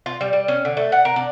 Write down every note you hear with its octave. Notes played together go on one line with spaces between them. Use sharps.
F4
G3
G3
C#4
D3
A3
F#5
A#4
D4